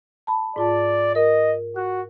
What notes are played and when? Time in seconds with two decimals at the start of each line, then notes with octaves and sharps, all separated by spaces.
0.27 A5 B5
0.56 G#2 F4 D5 A5
1.15 A#4 D#5
1.76 F#4 F#6